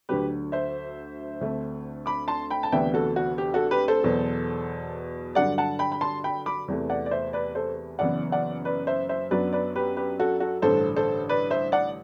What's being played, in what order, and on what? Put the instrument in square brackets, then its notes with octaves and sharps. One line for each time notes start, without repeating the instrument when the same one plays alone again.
[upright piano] D2 D3 F#3 G4 B4
C5 E5
D2 D3 A3 C4
B5 D6
A5 C6
G5 B5
A5
D2 C3 E3 B3 D4 E5 G5
F#4 A4
F#4
G4
F#4 A4
G4 B4
A4 C5
E2 B2 F#3
G2 D3 F#3 D5 F#5
F#5 A5
G5 B5
B5
A5 C6
G5 B5
B5 D6
E2 C3 E3 A3
D5 F#5
D5
C5 E5
B4 D5
A4 C5
F#1 F#2 E3 B3 D5 F#5
D5 F#5
B4 D5
C5 E5
C5 E5
F#2 F#3 B3 D4 B4 D5
B4 D5
G4 B4
G4 B4
F#4 A4
F#4 A4
A1 G2 D3 A4 C5
A4 C5
B4 D5
C5 E5
D5 F#5